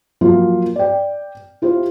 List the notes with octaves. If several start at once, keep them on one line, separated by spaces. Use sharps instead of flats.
F3 F#3 A#3 F4
D5 G5
E4 F4 G4 C5